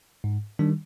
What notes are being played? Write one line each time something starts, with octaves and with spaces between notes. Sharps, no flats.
G#2
D#3 G3 D4